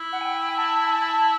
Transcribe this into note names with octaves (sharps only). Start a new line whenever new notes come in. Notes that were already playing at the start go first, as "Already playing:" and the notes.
Already playing: E4
F#5
G#5
G5
G#5
A5
G#5
A5